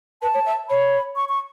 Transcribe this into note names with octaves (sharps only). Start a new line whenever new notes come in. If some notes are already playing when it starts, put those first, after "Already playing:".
B4 A5
C#5
E5
C#5 B5
C#6
C#6